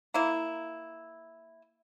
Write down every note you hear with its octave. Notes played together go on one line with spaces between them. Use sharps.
A#3 E4